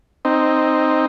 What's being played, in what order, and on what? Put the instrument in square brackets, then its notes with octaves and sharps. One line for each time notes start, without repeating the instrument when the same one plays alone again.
[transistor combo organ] C4 D#4